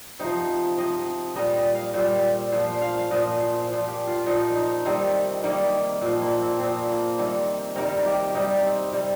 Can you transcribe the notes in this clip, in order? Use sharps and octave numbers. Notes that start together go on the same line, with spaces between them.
C3 F3 D#4
C3 F3 D#5
A#2 G3 D#5
D#5
F5
A#2 G3 C5
A#2 F3 C5
F5
F5
A#2 F3 D#5
C5
A#2 F3
G4
F4
A#2 F3 D#4
D#4
C3 D#3 G3 C4
C3 D#3 G3 A#3
A#2 F3 C4
A#3
C4
A#2 F3 C4
A#3
C3 D#3 G3 C4
C3 D#3 G3 A#4
A#4
G4
C3 G3 D#4
C4
C3 G3